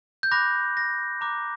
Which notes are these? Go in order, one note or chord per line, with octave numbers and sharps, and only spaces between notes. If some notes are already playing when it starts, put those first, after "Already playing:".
G6
B5 D6 F#6 A#6
A#6
A#5 D6 F#6